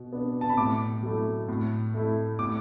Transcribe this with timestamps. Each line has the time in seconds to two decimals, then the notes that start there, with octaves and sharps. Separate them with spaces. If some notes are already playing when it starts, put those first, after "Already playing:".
Already playing: B2
0.12 B3 D4
0.41 A5
0.49 B5
0.57 A2 D6
1.03 F#3 A3 E4
1.48 A2
1.94 A3 E4
2.39 A2 D6